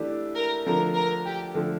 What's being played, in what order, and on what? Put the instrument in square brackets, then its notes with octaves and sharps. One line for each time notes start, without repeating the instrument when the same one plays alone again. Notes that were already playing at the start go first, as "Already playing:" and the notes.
Already playing: [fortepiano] E3 A3 D4 G4
[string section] A#4
[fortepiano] D3 F3 A3 [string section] A#4
[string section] A#4
G4
[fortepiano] D3 F3 A3